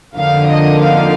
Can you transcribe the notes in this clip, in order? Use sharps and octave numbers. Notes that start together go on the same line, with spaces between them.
F2 D3 F3 A#3 D#4 F5
D#5
F5